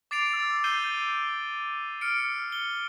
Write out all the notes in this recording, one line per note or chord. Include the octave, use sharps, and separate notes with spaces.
D6 A6 C7 D7 F7
E6 A6
G6 C7 D#7 G7
F6 C#7 D7
G7